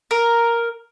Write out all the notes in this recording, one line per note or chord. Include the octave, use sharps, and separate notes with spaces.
A#4